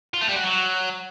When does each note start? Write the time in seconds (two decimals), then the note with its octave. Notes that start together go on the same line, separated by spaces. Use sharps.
0.14 F4
0.21 A3
0.29 G3
0.36 F#4
0.44 F#3